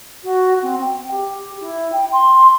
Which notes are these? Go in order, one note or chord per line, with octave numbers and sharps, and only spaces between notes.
F#4
C4
G5
G4
E4
G5
C6